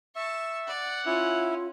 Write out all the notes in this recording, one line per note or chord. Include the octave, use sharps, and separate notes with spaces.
E5 A5 C#6
D5 F#5
C#4 E4 F4